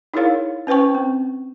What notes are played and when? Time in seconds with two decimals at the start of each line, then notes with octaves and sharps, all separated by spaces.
0.14 D#4 E4 G#4 A#4 C#5 F5
0.67 C#4 B4 C5 G5 C#6
0.95 C4